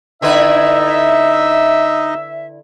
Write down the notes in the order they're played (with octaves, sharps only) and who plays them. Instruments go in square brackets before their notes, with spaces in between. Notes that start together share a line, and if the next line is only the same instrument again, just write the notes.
[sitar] D3 E4 B4 [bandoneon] D#4 D#5 [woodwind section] E5